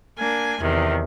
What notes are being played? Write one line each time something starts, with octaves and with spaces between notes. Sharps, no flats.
A#3 D4 G#5
E2 C3 D#3